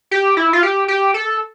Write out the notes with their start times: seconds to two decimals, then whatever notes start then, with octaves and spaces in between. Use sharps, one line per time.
0.11 G4
0.37 E4
0.53 F4
0.63 G4
0.88 G4
1.14 A4